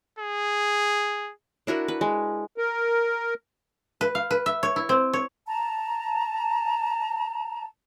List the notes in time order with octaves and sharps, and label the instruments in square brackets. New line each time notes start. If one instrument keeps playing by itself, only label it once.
[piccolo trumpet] G#4
[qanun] D4 E4 F#4 A#4
B4
G#3
[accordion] A#4
[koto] B4
F5
B4
E5
C#5
E4
C4
C#5
[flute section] A5 A#5